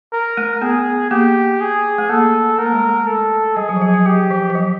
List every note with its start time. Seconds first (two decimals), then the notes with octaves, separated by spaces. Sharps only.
0.13 A#4
0.37 A3
0.62 B3 G#4
1.11 A#3 G4
1.61 G#4
1.98 A3
2.09 A#3 A4
2.58 A#3 A#4
2.66 A3
2.72 G#3
2.80 A3
3.07 A4
3.56 G3 G#4
3.69 F#3
3.76 F3
3.81 F#3
3.94 F#3
4.06 F#3 G4
4.31 F3
4.50 F3
4.55 F#3